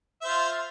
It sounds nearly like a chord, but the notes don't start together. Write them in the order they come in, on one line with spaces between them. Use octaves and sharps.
E5 C5 F4